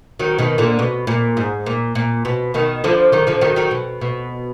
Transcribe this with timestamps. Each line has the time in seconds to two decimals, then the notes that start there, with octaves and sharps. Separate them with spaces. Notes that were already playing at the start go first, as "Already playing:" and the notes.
0.19 D#3 F#3
0.39 B2 D#3
0.58 A#2 D3
0.79 B2
1.07 A#2
1.37 G#2
1.66 A#2
1.95 A#2
2.25 B2
2.54 B2 D#3
2.84 D3 F3
3.12 D#3 F#3
3.27 D3 F3
3.41 D#3 F#3
3.56 D#3 F#3
3.71 B2
4.01 B2